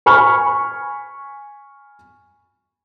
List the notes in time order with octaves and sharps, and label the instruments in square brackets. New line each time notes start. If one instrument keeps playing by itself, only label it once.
[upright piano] G#5 B5 C#6 F6